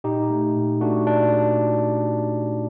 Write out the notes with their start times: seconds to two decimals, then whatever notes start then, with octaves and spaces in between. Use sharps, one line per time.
0.04 A#2 D#4 G4
0.30 A3
0.56 A#2
0.81 A3 D4 F#4
1.07 A#2 D4